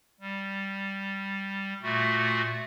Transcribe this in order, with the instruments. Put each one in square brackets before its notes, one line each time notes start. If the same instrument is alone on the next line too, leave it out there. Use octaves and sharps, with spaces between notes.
[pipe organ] G3
A#2 A3 F#4